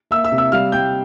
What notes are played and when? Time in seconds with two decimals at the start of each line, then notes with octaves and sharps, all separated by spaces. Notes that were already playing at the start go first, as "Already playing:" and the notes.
0.11 A#3 E5 E6
0.24 E5 E6
0.32 C3
0.38 E5 E6
0.52 G3 F5 F6
0.72 G3 G5 G6